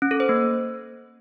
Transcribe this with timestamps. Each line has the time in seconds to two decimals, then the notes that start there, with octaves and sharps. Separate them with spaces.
0.02 C#4
0.11 A4
0.20 C5
0.29 A#3